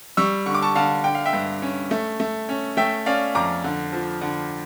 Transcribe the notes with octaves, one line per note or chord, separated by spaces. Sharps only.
G3 C#6 E6
D3 C#6
D6
A5 C#6
D3 F5 A5
D3 G5
F5
E5 G5
G2
C#4
A3
A3
C#4
A3 E5 G5
C#4 D5 F5
F2 A#5 D6
D3
F3
D3